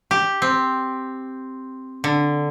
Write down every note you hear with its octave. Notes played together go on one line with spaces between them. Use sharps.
G4
C4
D3